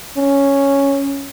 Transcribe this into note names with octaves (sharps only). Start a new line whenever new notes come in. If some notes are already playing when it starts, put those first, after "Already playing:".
C#4